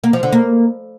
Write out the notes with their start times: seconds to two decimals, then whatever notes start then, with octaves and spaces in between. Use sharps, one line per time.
0.04 A#3
0.13 F3
0.23 D3
0.32 A#3